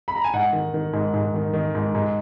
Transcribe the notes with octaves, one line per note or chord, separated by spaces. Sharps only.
B5
A#5
G#5
G#2 F#5
D#3
D#3
G#2
G#2
D#3
D#3
G#2
G#2